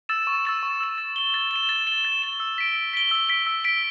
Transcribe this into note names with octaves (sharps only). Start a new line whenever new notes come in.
E6 A6 E7
C#6
E6 A6 E7
C#6
E6 A6 E7
A6
E7 G7
A6
E7 G7
A6
E7 G7
A6
E7 G7
E6
B6 D7 G7
E6
B6 D7 G7
E6
B6 D7 G7
E6
B6 D7 G7